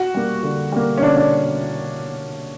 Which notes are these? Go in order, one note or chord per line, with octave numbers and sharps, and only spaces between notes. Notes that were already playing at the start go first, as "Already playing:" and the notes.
Already playing: F#4
G3 A#3
D3
G3 A#3
C#4
D3 D4
D4